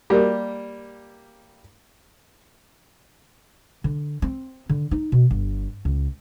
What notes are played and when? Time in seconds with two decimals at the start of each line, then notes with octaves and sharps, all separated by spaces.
0.10 G3 A#3
3.84 D3
4.22 C4
4.69 D3
4.91 D#4
5.12 B2
5.31 G1
5.85 C#2